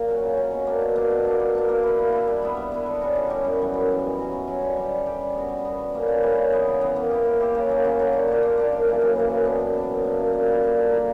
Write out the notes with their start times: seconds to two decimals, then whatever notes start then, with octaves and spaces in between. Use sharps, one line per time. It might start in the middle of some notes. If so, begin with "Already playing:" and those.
Already playing: A#2 A#3
0.08 F#3 C#4
0.23 C#3
0.37 F#3 C#4
0.52 B2
0.67 A#3 D4
0.81 B2
0.96 A#3 D4
1.10 B2
1.24 A#3 D4
1.40 B2
1.55 A#3 D4
1.69 A#3
1.83 E4 B4
1.99 A#3
2.12 E4 B4
2.27 G3
2.42 B3 E4
2.57 G3
2.72 B3 E4
2.86 D3
3.01 G3 C#4 F#4
3.15 D3
3.30 G3 C#4 F#4
3.44 F#2
3.59 E3 G3
3.74 F#2
3.89 E3 G3
4.03 B2
4.18 F#3 C#4 F#4
4.32 B2
4.47 F#3 C#4 F#4
4.62 D3
4.77 G3 C#4 G4
4.91 D3
5.06 G3 C#4 G4
5.21 G3
5.35 B3 F#4
5.49 G3
5.65 B3 F#4
5.79 D3
5.94 G3 A#3 C#4
6.08 D3
6.23 G3 A#3 C#4
6.37 C#3
6.52 E3 B3
6.67 C#3
6.81 E3 B3
6.96 A#3
7.11 E4 G4
7.25 A#3
7.40 E4 G4
7.55 C#3
7.69 F#3 A#3
7.85 C#3
7.99 F#3 A#3
8.13 D3
8.28 A#3 D4 G4
8.43 D3
8.57 A#3 D4 G4
8.72 F#2
8.87 C#3 E3 A#3
9.01 F#2
9.16 C#3 E3 A#3
9.30 F#2
9.45 E3 B3 D4
9.60 F#2
9.74 E3 B3 D4
9.89 F#2
10.04 D3 A#3
10.19 F#2
10.33 D3 A#3
10.48 G3
10.62 A#3 D4 A#4
10.77 G3
10.92 A#3 D4 A#4